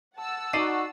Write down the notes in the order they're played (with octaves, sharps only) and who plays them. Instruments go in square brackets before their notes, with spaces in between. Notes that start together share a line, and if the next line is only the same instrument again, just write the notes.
[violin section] F#5 A5 E6
[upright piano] D#4 D5 D#7 [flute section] F#4 [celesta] C7